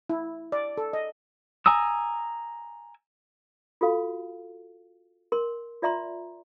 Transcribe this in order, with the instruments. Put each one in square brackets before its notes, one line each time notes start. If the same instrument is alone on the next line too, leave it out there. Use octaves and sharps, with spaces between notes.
[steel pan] E4
D5
A4
D#5
[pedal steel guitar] G#5 A#5 D#6 E6
[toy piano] F4 F#4 A4 F5
A#4 C6
F4 D5 E5 A#5 C6